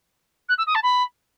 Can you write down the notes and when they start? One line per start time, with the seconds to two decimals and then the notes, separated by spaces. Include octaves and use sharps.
0.49 F#6
0.58 E6
0.67 D#6
0.75 A5
0.83 B5